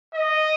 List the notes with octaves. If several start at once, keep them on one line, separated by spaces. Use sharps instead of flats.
D#5